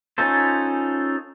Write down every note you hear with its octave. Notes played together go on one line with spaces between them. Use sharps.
C#4 D#4 F4 A4 C5